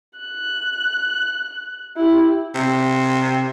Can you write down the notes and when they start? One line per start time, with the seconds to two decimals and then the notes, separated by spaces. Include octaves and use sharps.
0.19 F#6
1.96 E4 G4
2.55 C3